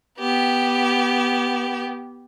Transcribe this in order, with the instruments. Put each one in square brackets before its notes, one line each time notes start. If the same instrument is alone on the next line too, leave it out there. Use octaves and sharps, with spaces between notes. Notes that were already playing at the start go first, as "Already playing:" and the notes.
[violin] B3 G4